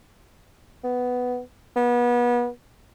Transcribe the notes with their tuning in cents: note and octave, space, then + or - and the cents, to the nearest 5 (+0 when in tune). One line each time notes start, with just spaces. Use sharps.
B3 +5
B3 -30